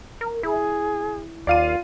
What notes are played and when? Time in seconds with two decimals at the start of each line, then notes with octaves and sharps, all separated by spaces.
0.21 A#4
0.43 E4 G#4
1.47 D#2 F4 D5 F5 D#7